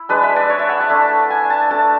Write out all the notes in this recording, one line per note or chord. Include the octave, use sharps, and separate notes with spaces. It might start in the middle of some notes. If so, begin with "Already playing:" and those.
Already playing: E4
G#3 D4 B4
E5
D5
C#5
E5
F#5
A5
A3 D4
G#5
A5
A3 D4 A5